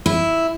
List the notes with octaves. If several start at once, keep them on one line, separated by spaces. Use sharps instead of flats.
E4